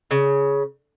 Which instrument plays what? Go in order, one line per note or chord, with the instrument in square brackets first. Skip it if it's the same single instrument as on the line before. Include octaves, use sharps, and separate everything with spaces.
[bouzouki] C#3